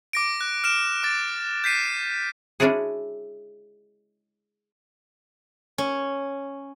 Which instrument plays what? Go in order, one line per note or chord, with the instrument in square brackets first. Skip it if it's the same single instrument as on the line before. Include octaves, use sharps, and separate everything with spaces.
[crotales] D6 A#6 D7
F#6
F6 D7 E7
D6 A6
G6 B6 C7 D#7
[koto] G#3 C#4 D4 E4 F#4 G#4
[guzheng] C#4